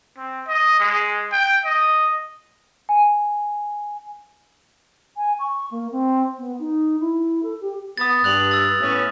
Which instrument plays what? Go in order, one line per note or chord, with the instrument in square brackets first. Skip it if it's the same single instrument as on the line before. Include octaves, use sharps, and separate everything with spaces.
[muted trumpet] C4
D#5
G#3
G5
D#5
[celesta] G#5
[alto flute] G#5
C#6
A#3
C4
B3
D#4
E4
A4
G4
[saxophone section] B3 [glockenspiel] D#6 A6
[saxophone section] G2 [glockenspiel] F#6 F7 F#7
[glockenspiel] E6 A6
[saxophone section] A2 B3 C#4